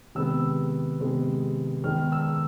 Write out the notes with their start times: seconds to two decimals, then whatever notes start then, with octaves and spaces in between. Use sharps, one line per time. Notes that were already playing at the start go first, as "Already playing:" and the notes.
0.15 C3 D#3 G#3 B3 E6
1.00 C3 D#3 G#3 B3
1.84 D#3 G#3 B3 F6
2.12 E6